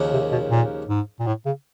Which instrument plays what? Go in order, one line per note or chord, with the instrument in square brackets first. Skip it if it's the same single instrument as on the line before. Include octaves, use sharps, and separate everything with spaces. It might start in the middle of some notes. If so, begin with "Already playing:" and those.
Already playing: [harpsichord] D#2 C#3 F3 A#3
[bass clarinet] C3
B2
A#2
G#2
A#2
A2
C#3